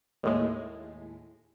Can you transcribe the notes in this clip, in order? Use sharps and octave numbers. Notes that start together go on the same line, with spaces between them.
D#2 A2 G#3